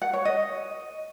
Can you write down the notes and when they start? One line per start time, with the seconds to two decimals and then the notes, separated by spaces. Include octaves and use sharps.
0.02 F#5
0.13 C#5
0.25 D#5